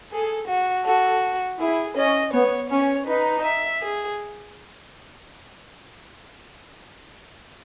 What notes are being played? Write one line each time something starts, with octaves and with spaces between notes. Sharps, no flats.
G#4 A4
F#4
F#4 A4
E4 G#4
C#4 D#5
B3 C#5
C#4 C#5
D#4 B4
E5
G#4